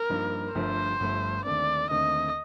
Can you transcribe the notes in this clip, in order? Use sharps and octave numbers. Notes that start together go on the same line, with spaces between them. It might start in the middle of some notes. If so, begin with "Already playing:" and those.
Already playing: A#4
G2 F3 A#3 D#4
G1 G2 F3 A3 C5
G1 G2 F3 A3
D#2 D3 A3 C4 D5
D#2 D3 A3 C4 D#5